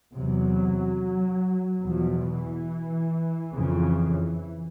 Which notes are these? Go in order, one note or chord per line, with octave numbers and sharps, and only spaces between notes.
E2 C3 F#3
E2 B2 F3
E3
F2 C#3